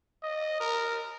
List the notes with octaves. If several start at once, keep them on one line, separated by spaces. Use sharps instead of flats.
D#5
A#4